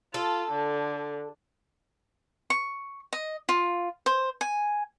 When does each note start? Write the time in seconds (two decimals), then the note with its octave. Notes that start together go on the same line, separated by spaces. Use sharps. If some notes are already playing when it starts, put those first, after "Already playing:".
0.14 F4 A4
0.52 D3
2.50 C#6
3.13 D#5
3.49 F4
4.06 C5
4.41 G#5